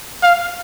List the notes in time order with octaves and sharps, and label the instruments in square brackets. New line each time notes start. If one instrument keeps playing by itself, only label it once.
[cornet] F5